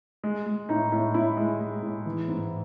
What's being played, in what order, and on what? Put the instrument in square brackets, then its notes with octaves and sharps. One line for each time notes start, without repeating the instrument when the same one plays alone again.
[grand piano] G#3
G#3
A2 D#4
A2
A2 E4
G#3
G#3
A2
E3
G#2